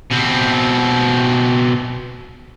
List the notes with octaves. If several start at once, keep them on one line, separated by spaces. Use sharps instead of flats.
B2 C4